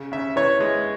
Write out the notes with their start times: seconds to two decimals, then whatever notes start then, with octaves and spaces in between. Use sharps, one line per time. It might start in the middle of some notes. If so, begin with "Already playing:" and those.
Already playing: C#3
0.12 C#3 E5
0.36 E3 C#5
0.60 G#3